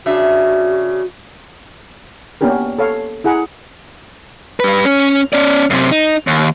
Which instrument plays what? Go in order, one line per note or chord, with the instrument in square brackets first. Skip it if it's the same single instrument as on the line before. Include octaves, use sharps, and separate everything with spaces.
[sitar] C#3 D4 E5 [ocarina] F#4
[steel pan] A#3 B3 C#4 D4 G4 A#4
A4 C#5 F5
E4 G#4 F#5 G#5 A#5
[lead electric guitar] G3 B4
C#4
C#4 D5
F#2 C3
D#4
D#2